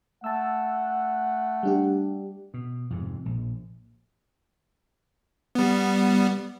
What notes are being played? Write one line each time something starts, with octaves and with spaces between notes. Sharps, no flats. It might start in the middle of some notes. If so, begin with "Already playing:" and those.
A3 F#5 A5 E6
G3 D4 G4
B2
F2 G#2 C3
A#1
G3 B3